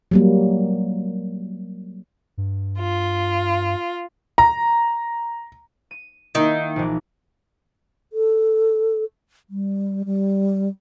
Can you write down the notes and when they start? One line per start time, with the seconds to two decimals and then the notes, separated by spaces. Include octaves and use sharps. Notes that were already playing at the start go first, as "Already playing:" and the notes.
0.11 F#3 G3 A#3
2.38 G2
2.78 F4
4.38 A#5
5.91 D#7
6.35 D#3 A#3 D#4 E4
6.76 A#1 E3
8.13 A4
9.50 G3
10.05 G3